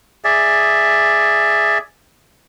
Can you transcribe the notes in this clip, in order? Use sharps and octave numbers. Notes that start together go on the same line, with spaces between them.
G#4 D5 E5